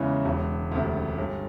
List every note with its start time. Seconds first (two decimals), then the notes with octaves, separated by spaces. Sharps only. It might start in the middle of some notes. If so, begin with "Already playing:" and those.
Already playing: E2 C#3 E3 G#3 C#4
0.25 E1
0.72 D2 C3
1.18 G1